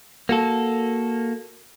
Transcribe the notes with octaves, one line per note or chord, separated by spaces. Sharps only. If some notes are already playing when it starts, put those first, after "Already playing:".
A#3 F#4 A4